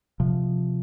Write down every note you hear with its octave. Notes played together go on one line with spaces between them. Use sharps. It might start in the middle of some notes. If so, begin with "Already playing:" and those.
C3 F3